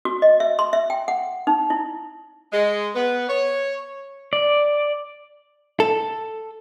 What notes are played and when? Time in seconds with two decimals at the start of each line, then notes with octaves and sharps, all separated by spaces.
0.05 F#4
0.22 D#5
0.40 E5
0.59 C6
0.73 E5
0.90 G5
1.08 F#5
1.47 D#4
1.70 E4
2.52 G#3
2.95 B3
3.28 C#5
4.33 D5
5.80 A4